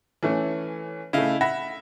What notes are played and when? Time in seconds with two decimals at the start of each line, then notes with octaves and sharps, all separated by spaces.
0.23 E3 A3 C#4
1.13 C#3 A3 E4 D#5 F5
1.41 E5 F#5 B5 A#6